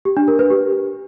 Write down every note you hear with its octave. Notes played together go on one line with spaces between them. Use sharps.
G4
D4
A#4
B4
G4